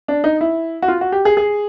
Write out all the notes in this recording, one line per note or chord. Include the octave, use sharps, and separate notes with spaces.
D4
D#4
E4
F#4
F4
F#4
G4
G#4
G#4